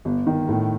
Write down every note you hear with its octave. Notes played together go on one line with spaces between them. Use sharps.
G1
D#3
A2